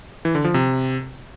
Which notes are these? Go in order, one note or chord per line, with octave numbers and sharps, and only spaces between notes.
E3
D3
F3
C3